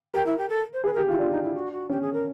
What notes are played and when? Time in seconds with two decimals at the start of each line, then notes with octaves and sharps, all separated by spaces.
0.14 G4 A#4
0.26 E4
0.37 G4
0.49 A4
0.73 C5
0.84 G#4 B4
0.93 A#4
0.97 G4
1.08 E4 F4
1.19 D4 F4
1.30 D#4
1.43 E4
1.54 F#4
1.72 F#4
1.89 C#4 G4
2.01 G#4
2.13 A#4